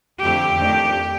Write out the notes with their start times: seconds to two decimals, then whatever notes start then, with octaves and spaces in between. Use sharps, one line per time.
0.20 F2 D3 A3 G4
0.57 F2 D#3 A3 D4